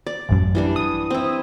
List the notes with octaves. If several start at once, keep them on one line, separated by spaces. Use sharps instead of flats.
D5
A1 F#2
E3 G3 D4
D#6
C4 E4